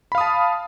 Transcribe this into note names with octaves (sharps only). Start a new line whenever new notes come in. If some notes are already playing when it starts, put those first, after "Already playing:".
F5 A5 B5 D#6